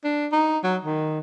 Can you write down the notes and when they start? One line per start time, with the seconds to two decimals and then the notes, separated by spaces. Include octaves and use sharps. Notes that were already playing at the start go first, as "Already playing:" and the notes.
0.04 D4
0.32 D#4
0.64 F#3
0.85 D#3